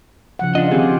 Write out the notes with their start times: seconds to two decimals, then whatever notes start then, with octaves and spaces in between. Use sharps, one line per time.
0.39 C#3 F3 F#5
0.55 D4 F4 D#5
0.71 D#3 C4 F4 G4 G#4